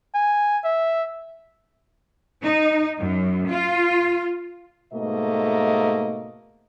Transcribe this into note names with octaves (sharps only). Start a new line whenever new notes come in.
G#5
E5
D#4
F#2
F4
G#2 B2 A3 A#3 D#5